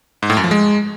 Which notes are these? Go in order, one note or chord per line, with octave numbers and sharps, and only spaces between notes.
G#2
A2
F#2
F3
G#3